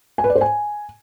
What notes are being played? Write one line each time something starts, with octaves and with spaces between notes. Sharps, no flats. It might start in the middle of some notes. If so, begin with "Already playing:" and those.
G#5
B4
D5
C5
G#5